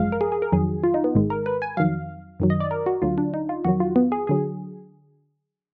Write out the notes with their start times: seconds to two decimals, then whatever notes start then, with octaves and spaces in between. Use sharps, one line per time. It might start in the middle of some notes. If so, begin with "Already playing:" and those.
Already playing: G#1 F#2 F3 G#3 F5
0.12 A#4
0.21 G#4
0.32 G#4
0.42 A#4
0.52 F2 D#3 F#3 G#4
0.84 F4
0.94 D#4
1.04 B3
1.15 G#1 G#2 D#3 G#3
1.30 A#4
1.46 B4
1.62 G#5
1.77 F2 D#3 F#3 F5
2.40 F#2 D#3 F#3
2.50 D#5
2.60 D5
2.71 A#4
2.86 F#4
3.02 D2 D3 F#3 F4
3.18 D4
3.34 D#4
3.49 F4
3.65 F2 D#3 F#3 F#4
3.80 F4
3.96 B3
4.12 G#4
4.27 D3 F#3 G#4